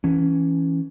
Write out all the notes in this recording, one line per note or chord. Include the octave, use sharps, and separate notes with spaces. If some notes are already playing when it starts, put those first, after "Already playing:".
E3 C#4